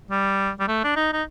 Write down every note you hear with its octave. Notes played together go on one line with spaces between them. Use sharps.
G3
G3
A3
D4
D#4
D#4